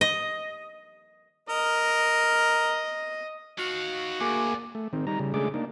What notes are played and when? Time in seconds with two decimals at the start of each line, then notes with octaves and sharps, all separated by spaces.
0.01 D#5
1.49 A#4 D#5
3.59 D#4 F#4 F5
4.21 D2 A#3 G#4 G#5 D6
4.75 A3
4.93 D#3 C4
5.07 G3 D#4 A#5
5.19 C#3 G3
5.34 C#3 G#3 A3 D4 G#4 D6
5.54 A#3 D4 D#4